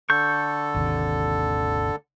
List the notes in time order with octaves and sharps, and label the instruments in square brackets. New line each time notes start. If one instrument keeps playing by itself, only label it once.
[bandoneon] D3 A4 [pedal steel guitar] C#6 G6
[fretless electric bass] G#1 D#2 C3